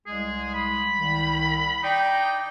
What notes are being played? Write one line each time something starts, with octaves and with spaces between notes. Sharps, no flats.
C2 G#3 G#4
B5
C2 D#3
D#4 D5 G5